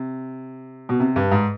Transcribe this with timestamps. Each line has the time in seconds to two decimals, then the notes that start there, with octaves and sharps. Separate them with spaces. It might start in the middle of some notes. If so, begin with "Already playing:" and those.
Already playing: C3
0.89 B2
1.00 C3
1.16 G2
1.31 G#2